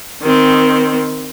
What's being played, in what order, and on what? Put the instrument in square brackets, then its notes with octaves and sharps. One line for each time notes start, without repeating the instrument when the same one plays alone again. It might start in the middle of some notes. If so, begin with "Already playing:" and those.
[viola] D#3 C4